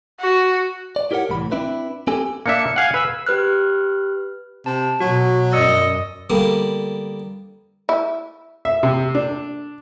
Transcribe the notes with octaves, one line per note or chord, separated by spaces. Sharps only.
F#4
D5
E4 G4 A#4 C#5 F#5
C2 A2 E3 B5
C4 D4 E4 B4
C4 G4 A4 G#5
A#3 D4 E5 C#7
F5 F#5 G#5
B4 E6
G4 B4 F6 F#6
C3 A5
B2 F#3 F#4
F#2 D5 D#5 E6 C#7
D3 G3 A#3 B3
E4
E5
C3
D4